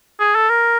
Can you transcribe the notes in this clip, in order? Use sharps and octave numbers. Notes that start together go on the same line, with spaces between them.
G#4
A4
A#4